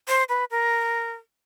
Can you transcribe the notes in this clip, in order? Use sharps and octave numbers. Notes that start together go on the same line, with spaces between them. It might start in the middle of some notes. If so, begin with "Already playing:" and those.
C5
B4
A#4